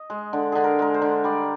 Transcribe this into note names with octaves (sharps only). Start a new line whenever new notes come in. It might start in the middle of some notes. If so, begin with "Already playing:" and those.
Already playing: D#5
G#3
D3
D3 G#4
A#4
G#3 A#4
C5
D3
G3 D5